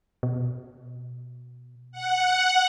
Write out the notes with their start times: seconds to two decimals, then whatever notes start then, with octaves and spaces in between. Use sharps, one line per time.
0.23 B2
1.92 F#5